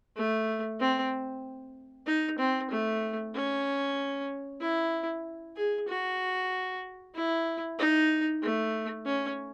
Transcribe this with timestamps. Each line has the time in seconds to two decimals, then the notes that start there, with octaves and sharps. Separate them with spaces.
0.17 A3
0.80 C4
2.06 D#4
2.38 C4
2.71 A3
3.34 C#4
4.61 E4
5.56 G#4
5.88 F#4
7.15 E4
7.78 D#4
8.42 A3
9.06 C#4